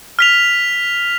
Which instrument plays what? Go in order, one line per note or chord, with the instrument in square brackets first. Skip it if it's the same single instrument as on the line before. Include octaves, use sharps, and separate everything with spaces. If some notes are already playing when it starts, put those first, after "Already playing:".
[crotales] F6 B6 F7